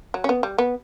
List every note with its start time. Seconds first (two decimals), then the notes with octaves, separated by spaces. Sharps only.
0.14 F#3
0.24 C#4
0.29 B3
0.43 G3
0.58 B3